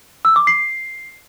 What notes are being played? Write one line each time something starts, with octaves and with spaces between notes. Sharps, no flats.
E6
D6
C7